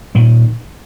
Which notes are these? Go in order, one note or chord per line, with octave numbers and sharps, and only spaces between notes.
A#2 D#3